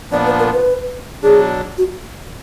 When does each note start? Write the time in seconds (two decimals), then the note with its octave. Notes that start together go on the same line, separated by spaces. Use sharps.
0.11 A#2 F3 B3 D4 D5
0.26 B4
0.39 A#4
0.53 B4
1.23 B2 F#3 D4 G#4
1.78 F#4